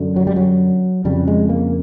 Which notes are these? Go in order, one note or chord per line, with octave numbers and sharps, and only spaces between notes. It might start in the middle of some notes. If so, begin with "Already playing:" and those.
Already playing: F#2 D3
F#3
G3
F#3
F2 C#3 G3
G#3
A#3